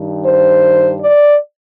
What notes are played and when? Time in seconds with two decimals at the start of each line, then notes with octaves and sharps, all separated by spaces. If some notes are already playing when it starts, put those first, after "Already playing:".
Already playing: G2 D#3
0.26 C5
1.01 D5